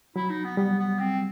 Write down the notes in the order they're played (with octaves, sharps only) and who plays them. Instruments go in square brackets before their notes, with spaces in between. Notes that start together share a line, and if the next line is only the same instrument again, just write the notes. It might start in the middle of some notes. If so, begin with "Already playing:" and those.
[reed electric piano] F#3 [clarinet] E4
[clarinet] D#4
B3
[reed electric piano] G3 [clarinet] B3
[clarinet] B3
C4